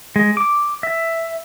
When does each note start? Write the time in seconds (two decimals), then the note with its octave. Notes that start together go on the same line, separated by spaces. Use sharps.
0.16 G#3
0.37 D6
0.83 E5